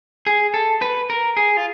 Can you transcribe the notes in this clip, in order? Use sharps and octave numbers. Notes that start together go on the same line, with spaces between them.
G#4
A4
B4
A#4
G#4
F4